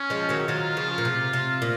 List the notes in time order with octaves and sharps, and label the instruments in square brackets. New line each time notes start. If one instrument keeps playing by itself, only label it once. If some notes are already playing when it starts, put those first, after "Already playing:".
Already playing: [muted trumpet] C#4
[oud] F3 G#3
D#3 F#3
[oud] D#3 F#3 [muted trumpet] F4
[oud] C#3 F3
A#2
C3
C3
A#2